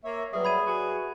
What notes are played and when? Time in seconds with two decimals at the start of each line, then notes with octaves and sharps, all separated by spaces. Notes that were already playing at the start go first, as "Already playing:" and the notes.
0.04 A#3 C#5 E5
0.33 F#3 G3 G#4 B4 E5
0.45 B5 G#6 D#7
0.67 F#4 G#4